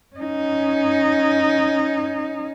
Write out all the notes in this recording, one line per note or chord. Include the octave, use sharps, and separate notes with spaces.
C#4 D#4